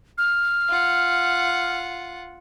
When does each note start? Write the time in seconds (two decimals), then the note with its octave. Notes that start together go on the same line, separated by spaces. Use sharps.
0.18 F6
0.69 F4 F#5